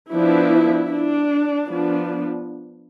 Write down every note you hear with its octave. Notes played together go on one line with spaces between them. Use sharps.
F3 B3 D4 E4
D4
F3 B3 D4